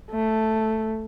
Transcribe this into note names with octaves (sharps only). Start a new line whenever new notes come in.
A3